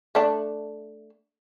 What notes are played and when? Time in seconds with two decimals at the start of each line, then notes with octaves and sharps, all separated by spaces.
0.15 A3 D4